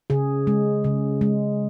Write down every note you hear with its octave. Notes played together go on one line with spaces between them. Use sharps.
C#3 G#4
G#3
C#3
G#3